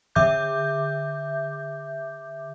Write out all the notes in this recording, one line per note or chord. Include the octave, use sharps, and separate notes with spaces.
D3 E5 D6 G6